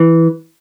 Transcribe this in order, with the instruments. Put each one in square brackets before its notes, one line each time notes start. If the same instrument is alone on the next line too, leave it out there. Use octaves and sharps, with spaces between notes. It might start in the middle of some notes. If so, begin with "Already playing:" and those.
Already playing: [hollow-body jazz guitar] E3